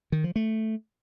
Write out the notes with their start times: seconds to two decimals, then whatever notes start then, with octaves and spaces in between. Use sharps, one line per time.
0.12 D#3
0.24 F3
0.36 A3